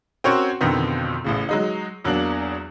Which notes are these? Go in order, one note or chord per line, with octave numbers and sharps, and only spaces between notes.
C4 C#4 F#4 A#4 C5 C#5
F2 B2 D3 D#3 B3 C4
A1 A2 C#3
F#3 G#3 D#4
E2 F#3 A#3 D4 F#7